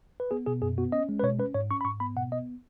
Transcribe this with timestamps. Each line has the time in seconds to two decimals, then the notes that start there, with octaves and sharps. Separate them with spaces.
0.20 B4
0.31 B3 G#4
0.47 B2 G#4
0.62 F#2 G#4
0.78 B3 F#4
0.92 C#4 D#5
1.09 G#3
1.19 B4
1.24 B2 C#5
1.39 C#4 B4
1.55 G#2 C#5
1.71 C#4 C#6
1.81 B5
1.85 G#2 C#6
2.00 B3 B5
2.17 B2 F#5
2.32 B3 D#5